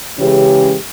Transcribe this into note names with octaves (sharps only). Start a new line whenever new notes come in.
C#3 E3 G#3 C#4 G4